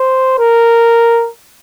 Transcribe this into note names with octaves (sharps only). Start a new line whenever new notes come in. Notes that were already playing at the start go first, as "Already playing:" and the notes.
Already playing: C5
A#4